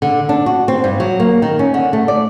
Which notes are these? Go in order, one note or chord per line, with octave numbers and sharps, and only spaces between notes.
D3
D4
F#4
C4
G2
F#3
A#3
D#3
C#4
D3
A3
D5